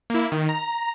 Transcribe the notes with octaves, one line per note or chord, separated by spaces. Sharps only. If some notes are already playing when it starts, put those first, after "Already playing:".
A#3 E4
D#3
A#5